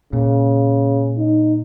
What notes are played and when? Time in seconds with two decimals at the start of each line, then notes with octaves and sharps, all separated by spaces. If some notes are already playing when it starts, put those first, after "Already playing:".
0.13 A#2 C#3
1.17 D#4